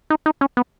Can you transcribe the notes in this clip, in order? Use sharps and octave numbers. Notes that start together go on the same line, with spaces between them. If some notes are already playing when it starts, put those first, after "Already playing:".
D#4
D#4
C#4
B3